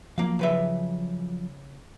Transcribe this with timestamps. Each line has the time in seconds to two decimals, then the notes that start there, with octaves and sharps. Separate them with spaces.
0.18 F3 F#3 A#3 F5
0.39 C#3 B4 E5